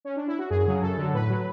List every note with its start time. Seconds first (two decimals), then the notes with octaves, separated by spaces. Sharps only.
0.05 C#4
0.16 D4
0.28 E4
0.38 F#4
0.50 F#2 G#4
0.66 C#3 F#3
0.82 F#2 A4
0.98 D3 F#3
1.14 A2 B4
1.29 F#3